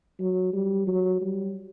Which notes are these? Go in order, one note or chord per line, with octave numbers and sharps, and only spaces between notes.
F#3
G3
F#3
G3